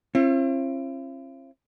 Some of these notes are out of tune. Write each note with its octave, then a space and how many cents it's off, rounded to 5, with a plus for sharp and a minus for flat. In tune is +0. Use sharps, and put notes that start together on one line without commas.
C4 +45 E4 +45